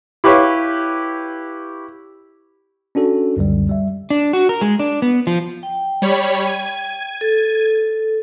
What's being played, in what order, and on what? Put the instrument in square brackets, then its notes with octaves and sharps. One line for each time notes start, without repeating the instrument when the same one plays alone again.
[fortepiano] E4 G4 B4 C#5 F5
[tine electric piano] C#4 D4 F#4 A4
C#2 F#2 D3 G3
G3 E5
[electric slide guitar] D4
F#4
A#4
G#3
D4
B3
F3
[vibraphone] G5
[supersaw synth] G3 C#5 B5
G#6 D#7
[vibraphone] A4